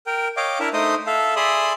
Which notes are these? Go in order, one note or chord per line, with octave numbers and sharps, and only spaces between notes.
A#4 G5
C#5 D#5 F5 G5 D6
D4 E4 A#4 E5
A3 D#4 C5 D#5 D#6
A4 E5 F5
G#4 D5 E5 B5 C6 D#6